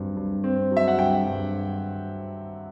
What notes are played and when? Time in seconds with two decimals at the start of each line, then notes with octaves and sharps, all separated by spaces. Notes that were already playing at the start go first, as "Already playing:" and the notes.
Already playing: G2 F#3 C4
0.16 G2
0.44 C4
0.71 F#3
0.77 E5
0.88 F#5
0.98 G2 G5
1.26 G2